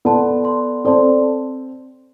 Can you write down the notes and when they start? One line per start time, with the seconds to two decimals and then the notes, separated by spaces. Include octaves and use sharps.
0.05 B3 A4 D5 A5 C6
0.44 A4 D5 A5 C6
0.85 C4 A4 D5 A5 C6